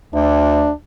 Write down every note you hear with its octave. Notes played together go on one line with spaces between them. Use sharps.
D2 D4